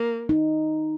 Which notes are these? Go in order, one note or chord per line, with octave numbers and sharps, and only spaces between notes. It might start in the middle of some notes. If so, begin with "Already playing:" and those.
Already playing: A#3
D#4